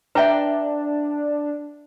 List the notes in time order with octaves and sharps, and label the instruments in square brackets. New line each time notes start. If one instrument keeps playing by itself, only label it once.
[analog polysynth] D4 [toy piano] B4 E5 [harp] D5 G5 A#5